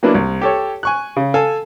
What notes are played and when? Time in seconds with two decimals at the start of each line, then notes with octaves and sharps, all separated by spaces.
0.03 F#3 A#3 B3 D4 E4
0.15 C2
0.42 G4 A4 C#5
0.83 G#5 C#6 F#6
1.17 C#3
1.34 A4 F5 G#5